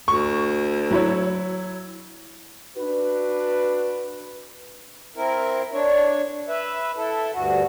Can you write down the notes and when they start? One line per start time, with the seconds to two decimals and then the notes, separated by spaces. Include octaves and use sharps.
0.08 D2 C#6
0.91 F#3 E4 C#5
2.76 D4 F#4 B4
5.16 C4 E4 A#4
5.73 D4 C#5
6.48 B4 E5
6.97 E4 A4
7.33 D2 G2 F#4